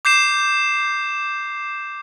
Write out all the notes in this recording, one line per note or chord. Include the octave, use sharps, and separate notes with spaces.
D6 G6 C7 E7